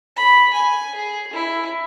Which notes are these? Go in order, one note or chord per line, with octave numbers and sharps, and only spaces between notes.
B5
G#5
G#4
E4